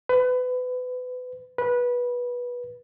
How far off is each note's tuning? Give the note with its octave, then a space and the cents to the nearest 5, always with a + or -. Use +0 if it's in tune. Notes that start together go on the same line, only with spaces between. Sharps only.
B4 +30
B4 -15